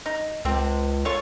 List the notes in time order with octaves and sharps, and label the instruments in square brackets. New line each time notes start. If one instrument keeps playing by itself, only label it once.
[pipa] D#4
[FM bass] C#2 [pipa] C4 A4
[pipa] F4 A4 C#5